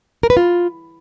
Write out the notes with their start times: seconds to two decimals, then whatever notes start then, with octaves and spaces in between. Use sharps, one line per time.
0.23 A#4
0.30 B4
0.37 F4